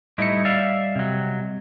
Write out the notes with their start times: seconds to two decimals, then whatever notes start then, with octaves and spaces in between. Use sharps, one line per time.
0.18 A2 G3 D#4 E4 D#5 C#7
0.45 D5 E5 F5
0.96 C3 F#3